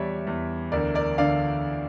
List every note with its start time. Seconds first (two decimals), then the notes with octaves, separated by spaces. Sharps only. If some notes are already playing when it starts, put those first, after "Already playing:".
Already playing: E2 G3 C#5 D5 E5
0.27 E2
0.72 D2 A#4 D5
0.95 A#4 D5
1.18 D3 D5 F5